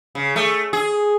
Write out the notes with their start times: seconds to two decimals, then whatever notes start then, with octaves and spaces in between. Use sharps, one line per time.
0.15 C#3
0.36 A3
0.73 G#4